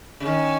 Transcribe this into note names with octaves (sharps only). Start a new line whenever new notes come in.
C#3
D#3 C#4